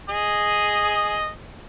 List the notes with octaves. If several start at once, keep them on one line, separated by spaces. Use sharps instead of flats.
G#4 D#5